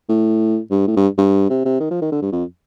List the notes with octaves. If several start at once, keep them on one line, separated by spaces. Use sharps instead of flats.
A2
G2
A2
G2
G2
C3
C3
D#3
F3
D#3
D3
G2
F2